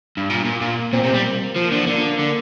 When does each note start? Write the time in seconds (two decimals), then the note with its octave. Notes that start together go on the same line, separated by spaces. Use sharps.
0.17 G2
0.30 A#2 A#3
0.45 A#2
0.61 A#2
0.93 A#2 C4
1.03 C3
1.14 G3
1.24 A#3
1.56 F3
1.72 D3
1.87 D3 A#3
2.19 D3